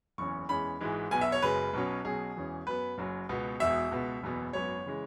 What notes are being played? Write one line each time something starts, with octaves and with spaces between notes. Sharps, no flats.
F#1 E2 E3 C#4 C#6
E2 E3 G#3 C#4 B5
G#1 G#2 E3 G#3
B1 B2 B3 G#5
E5
C#5
F#1 F#2 C#3 G#3 B4
B1 B2 F#3 C#4
B1 B2 F#3 C#4 G#4
E1 E2 E3 C#4
F#2 F#3 B3 B4
F#1 F#2 F#3
C#2 B2 B3
E1 E2 B2 E5
C#2 B2 B3
F#1 E2 B2 B3
G#1 F#2 F#3 B3 C#5
C#3 E3 G#3